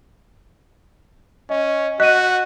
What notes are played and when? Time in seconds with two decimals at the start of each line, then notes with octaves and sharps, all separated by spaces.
1.50 C#4 D#5
2.00 F#4 D#5 F#6 D#7